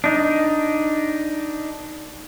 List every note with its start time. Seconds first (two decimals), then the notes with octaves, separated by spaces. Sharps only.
0.04 D4 D#4